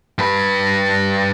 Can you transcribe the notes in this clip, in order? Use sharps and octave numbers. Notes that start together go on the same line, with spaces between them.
G2 B4